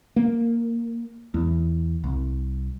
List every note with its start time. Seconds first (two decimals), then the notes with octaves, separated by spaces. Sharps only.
0.16 A#3
1.34 E2
2.04 C2